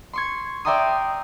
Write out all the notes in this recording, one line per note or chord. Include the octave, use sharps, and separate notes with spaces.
C6 C#6 G#6
D5 E5 G5 A#5 C6 D#6